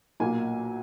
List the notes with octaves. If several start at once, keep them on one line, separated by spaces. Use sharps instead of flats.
B1 A#2 A#3 G#5